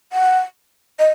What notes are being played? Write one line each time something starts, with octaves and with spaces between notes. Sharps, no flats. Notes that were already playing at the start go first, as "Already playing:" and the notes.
F#5
D#5